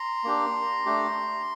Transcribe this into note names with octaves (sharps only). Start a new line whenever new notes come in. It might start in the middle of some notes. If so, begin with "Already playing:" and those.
Already playing: A#5 C6
A#3 D4 G4
A3 D4 G4